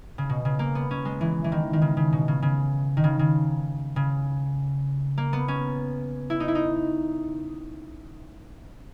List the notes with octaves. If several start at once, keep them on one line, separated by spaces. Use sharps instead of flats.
C#3
B2
C#3
A#3
B3
C#4
G#3
E3
E3
D#3
D#3
C#3
C#3
B2
C#3
C#3
D#3
C#3
C#3
C#3
A#3
B3
C#4
E4
D#4
E4
D#4